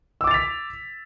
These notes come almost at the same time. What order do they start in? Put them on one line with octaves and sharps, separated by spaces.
E6 D6 A6 F7 B6